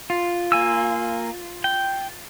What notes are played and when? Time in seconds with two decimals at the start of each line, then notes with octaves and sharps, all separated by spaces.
0.10 F4
0.52 A#3 G#5 E6
1.64 G5